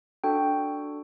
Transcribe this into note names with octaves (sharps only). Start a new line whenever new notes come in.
D4 F#4 A4 G5